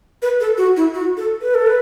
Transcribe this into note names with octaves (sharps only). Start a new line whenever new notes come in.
B4
A4
F#4
E4
F#4
A4
B4
A4
B4